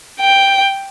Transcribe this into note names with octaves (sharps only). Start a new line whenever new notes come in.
G5